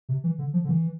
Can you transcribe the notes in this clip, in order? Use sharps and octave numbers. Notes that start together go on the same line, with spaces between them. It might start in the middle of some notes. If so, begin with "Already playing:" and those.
C3
E3
D3
F3
D3
E3